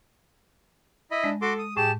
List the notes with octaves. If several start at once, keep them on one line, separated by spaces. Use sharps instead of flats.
E4 D#5 B5
G#3 D4
F#4 A4 C6 D6
D#6
A2 G4 G#4 A5 E7